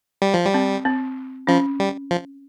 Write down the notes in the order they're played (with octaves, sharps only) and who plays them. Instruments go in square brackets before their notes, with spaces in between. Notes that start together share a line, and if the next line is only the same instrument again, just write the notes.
[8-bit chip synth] G3
F3
G3
[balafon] C4
C4
[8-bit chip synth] F3 [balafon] C#4
[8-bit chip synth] G3
F3